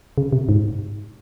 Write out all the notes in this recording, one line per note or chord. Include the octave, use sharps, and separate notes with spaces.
C#3
C3
G#2